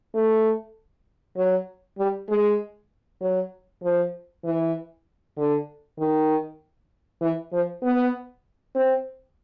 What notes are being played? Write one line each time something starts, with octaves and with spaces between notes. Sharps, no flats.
A3
F#3
G3
G#3
F#3
F3
E3
D3
D#3
E3
F3
B3
C4